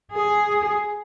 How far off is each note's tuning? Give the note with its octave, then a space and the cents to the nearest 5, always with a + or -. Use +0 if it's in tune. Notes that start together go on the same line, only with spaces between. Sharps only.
G#4 +5